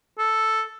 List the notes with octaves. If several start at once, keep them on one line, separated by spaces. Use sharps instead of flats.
A4